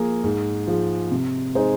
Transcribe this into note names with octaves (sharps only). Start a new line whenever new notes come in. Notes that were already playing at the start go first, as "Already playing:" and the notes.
Already playing: F3 A#3 G#4
G#2
F3 G#3
C3
G#3 D#4 G#4 C5